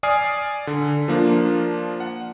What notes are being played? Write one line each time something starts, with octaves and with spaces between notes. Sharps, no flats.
D5 G#5 D#6 F6 C7
D3
F3 A#3 D4 F4
F#5